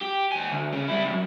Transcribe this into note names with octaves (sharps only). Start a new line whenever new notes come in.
G4
D#2 G#5
D2
C#3
G3 E4
B1 F#2